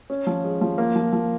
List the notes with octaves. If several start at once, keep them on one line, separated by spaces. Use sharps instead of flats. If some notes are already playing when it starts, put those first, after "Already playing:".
C#4
F3
G#3
F3
A#3
F3
F3